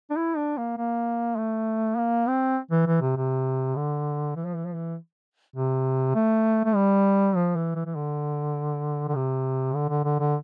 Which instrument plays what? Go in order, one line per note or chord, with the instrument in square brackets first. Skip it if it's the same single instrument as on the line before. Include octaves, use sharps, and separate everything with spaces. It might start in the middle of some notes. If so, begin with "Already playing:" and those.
[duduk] D4
E4
D4
A#3
A#3
A3
A#3
C4
E3
E3
C3
C3
D3
E3
F3
E3
F3
E3
C3
A3
A3
G3
F3
E3
E3
E3
D3
D3
C3
D3
D3
D3
D3